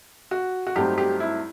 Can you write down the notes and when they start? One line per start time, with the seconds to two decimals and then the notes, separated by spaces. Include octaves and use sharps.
0.31 F#4
0.67 F#4
0.76 G2 F#3 A3 C4 D#4 G4
0.98 G4
1.20 E4